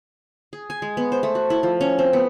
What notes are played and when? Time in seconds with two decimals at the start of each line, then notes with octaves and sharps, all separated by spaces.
0.53 G#4
0.70 G#5
0.82 G#3
0.97 B3
1.12 C5
1.23 A3
1.35 F#4
1.50 E4
1.63 F3
1.81 C#4
1.99 C4
2.13 B3